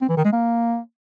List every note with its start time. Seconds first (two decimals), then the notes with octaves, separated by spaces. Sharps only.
0.01 C4
0.09 E3
0.17 D#3
0.25 G#3
0.32 A#3